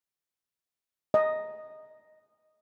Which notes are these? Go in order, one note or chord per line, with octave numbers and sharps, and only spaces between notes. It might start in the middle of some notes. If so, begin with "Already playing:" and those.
D#5